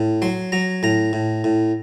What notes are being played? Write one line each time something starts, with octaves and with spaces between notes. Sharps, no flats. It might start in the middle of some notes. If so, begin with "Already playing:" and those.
Already playing: A2
F#3 C6
F#3 A#5
A2 A#5
A2
A2